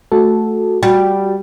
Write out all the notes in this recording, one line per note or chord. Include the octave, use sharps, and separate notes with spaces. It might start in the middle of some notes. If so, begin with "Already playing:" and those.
A3 F#4 A4
G3 F#4 G5